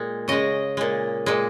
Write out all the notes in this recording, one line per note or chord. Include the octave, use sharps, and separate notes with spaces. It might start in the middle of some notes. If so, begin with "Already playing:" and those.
Already playing: A#2 G#3
C#3 G#3 D#5
A#2 G#3
A#2 G#3